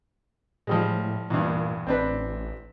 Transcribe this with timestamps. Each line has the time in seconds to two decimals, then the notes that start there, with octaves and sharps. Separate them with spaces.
0.67 A2 F3 G3 G#3
1.30 E2 G2 A#2
1.87 A1 C4 D4 B4